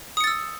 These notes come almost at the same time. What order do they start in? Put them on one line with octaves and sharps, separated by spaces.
D#6 C#7 A6 E6